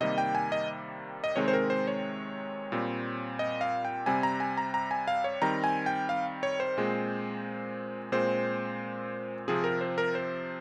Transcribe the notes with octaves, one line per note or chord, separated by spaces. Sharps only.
C3 D#3 G3 A#3 D#5
G5
G#5
D#5
D#5
C3 D#3 G#3 C4 C#5
C5
A#4
C5
C#5
A#2 G3 C4
D#5
F5
G5
C3 G3 C4 G#5
A#5
G#5
A#5
A#5
G#5
F5
C#5
D#3 G3 C4 A#5
G#5
G5
F5
C#5
C5
A#2 G#3 C4
A#2 G#3 C4 C5
C3 F3 C4 G#4
A#4
C5
A#4
C5